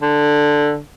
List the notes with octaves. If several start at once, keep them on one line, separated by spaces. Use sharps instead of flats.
D3